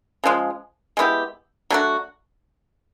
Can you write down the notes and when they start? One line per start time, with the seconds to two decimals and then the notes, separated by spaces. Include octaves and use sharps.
0.24 C#3 F3 G#3
0.97 G#3 B3 E4 G4
1.70 F#3 A3 D4 F#4